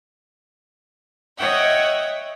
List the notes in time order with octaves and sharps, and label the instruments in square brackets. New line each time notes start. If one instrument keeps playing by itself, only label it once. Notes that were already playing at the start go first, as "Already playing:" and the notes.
[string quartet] C#5 D#5 E5 F#5 G5